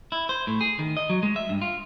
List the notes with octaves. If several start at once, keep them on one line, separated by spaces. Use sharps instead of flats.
E4
C5
A2
G#4
D#3
D#5
F#3
G#3
E5
G2
F4